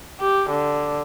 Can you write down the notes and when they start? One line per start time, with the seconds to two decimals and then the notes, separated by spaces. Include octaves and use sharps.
0.20 G4
0.49 D3